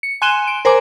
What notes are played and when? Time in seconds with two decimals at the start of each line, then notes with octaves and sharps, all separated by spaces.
0.03 C#7
0.22 G#5 C6 F#6 D#7 E7 G7
0.48 D7
0.65 A#4 C5 G#5 A#5 D6